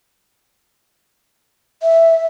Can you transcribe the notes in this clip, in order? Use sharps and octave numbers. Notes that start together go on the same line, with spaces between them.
E5